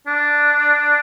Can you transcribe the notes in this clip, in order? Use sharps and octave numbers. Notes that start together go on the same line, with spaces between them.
D4